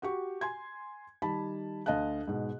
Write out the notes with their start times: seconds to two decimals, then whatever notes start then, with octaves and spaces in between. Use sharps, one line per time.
0.02 F#4 G4 C#6
0.41 G#5 C6 G#6
1.22 D#3 G3 A5 B5
1.86 D2 D#5 F5 A5 F#6
2.27 G#2 B2